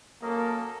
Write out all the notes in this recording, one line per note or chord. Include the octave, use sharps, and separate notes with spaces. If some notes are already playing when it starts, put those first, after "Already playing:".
F#3 A#3 C#4 A4 A#4 D#5 F5